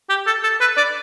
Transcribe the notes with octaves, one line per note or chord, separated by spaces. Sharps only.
G4
A4
A4
B4
D5